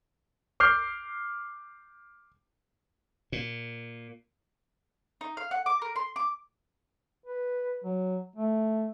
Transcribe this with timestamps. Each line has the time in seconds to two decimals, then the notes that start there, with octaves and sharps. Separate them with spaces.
0.60 D6 F6 G6 C7
3.32 A#2
5.21 D#4
5.37 F5
5.51 F#5
5.66 D6
5.82 A#4
5.96 C6
6.16 D6
7.26 B4
7.85 F#3
8.36 A3